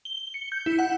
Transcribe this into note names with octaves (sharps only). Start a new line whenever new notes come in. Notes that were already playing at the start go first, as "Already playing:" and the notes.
G7
C#7
G6
E4
F#5